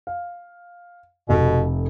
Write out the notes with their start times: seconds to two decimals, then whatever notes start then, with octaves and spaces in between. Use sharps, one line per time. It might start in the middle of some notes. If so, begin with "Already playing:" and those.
0.07 F5
1.29 F1 B2 A4